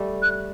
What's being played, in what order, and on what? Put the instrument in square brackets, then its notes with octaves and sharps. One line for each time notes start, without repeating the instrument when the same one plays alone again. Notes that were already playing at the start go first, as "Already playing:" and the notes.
Already playing: [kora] G3 A3
[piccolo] F#6